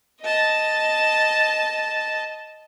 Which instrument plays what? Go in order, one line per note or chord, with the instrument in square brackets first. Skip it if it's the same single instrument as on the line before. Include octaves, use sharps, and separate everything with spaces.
[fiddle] D#5 A5